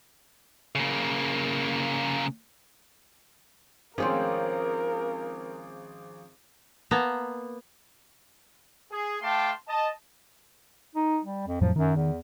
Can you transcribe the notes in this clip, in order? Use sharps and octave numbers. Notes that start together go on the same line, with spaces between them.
C#3 A#3
G#1 F3 C4 C#4 G#4 A#4
A#3 B3 A5 A#5
G#4
A3 F5 G5 A5 C6 D6
D#5 A5
D#4
G3
F2
F2 A2 F3 F#3
F#2 D#3
E2